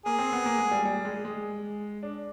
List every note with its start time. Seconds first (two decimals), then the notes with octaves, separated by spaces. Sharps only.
0.06 A#3 G#4
0.19 C4
0.33 B3
0.46 A#3
0.58 G#3
0.71 G3
0.85 G3
1.05 G#3
1.25 G#3
2.03 D4